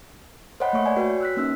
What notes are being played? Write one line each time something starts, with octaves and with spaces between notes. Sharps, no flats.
C5 C#5 D#5 F#5 G5 B5
A3 A#3 C#5 E5 C#6
D5 G#5
F#4 B4 C#5 G5
E6 F#6 B6
A#3 C#4 D#4 E6